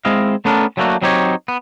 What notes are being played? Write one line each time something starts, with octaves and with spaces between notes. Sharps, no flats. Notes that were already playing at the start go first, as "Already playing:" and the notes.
G#3 C4 E4 D#5 F5
A3 B3 C#4 D4 A4 A#4
F#3 G3 A3 A#3 D4 F#4
F#3 C4 D#4 G4 C#5
B3